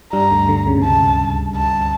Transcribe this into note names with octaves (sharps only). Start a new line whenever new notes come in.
G2 G3 A#5
D2 D3
D2 D3
C#2 C#3
C3
C#2 C#3 A5
A5